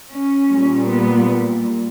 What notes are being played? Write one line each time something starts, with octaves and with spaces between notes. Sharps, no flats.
C#4
A#2 G3
B3